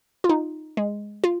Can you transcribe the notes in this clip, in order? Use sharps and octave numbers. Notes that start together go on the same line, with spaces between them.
F4
D#4
G#3
F4